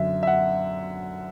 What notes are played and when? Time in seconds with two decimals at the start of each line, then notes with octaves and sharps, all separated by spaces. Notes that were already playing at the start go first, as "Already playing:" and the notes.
Already playing: F#2 D3 E5
0.23 E5
0.27 F#5